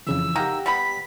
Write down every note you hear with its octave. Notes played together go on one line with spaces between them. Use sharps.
F2 C#3 E3 E6
A#3 D#4 G4 F#5 G5 A#5
G3 B3 B5 B6